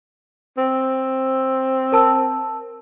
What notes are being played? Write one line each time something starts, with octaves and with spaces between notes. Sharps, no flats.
C4
A#4 A5 E6